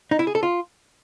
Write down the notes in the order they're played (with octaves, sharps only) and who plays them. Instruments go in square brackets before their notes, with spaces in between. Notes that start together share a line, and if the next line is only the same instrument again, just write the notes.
[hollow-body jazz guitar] D#4
E4
G#4
A4
F4